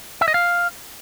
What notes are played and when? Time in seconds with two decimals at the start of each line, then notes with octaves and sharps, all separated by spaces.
0.21 E5
0.28 D#5
0.34 F5